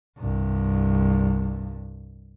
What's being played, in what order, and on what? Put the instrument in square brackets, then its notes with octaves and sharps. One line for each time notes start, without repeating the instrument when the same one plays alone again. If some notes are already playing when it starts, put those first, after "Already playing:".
[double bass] C2 G2